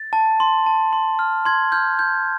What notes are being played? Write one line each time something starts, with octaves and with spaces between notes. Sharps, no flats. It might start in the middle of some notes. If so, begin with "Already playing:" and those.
Already playing: A6
A5
C6
A5
C6
F6
C6 G#6
F6 G6
G6